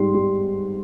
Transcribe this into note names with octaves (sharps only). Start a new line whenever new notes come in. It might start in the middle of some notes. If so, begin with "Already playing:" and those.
Already playing: G#2 G3 C6
G3